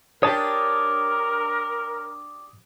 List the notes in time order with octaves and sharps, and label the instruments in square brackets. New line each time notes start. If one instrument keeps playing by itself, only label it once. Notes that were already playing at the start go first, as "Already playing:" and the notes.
[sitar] D4 G4 [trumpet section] A#4 [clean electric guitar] C#5 A5 [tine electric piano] D#6